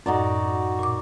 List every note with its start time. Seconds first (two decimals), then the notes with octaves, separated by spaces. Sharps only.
0.06 F#2 A2 D#4 F#4 D5
0.79 A#2 D6